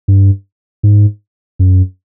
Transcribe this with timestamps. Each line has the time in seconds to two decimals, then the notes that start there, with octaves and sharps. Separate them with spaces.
0.08 G2
0.83 G#2
1.59 F#2